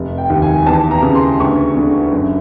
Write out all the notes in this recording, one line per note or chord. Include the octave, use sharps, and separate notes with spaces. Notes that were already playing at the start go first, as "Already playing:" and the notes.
Already playing: F1
G5
D#2
G#5
E2 A5
A#5
C#3
C6
D2 C#6
D3
F#1